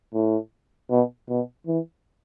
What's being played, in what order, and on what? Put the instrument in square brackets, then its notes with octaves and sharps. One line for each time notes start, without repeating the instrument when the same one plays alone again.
[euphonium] A2
B2
B2
E3